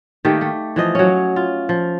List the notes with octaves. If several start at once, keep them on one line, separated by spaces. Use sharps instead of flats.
D#3 A3 A#3 G4
A3
E3 F3 D#5
F#3 C#4
F4
F3